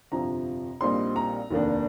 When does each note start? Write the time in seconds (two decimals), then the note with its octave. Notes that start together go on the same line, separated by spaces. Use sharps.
0.12 G1 F2 C3 F3 A#5
0.81 A#1 A#2 G3 C4 D#4 C6
1.16 A#5
1.50 F1 D#2 D#3 A#3 D4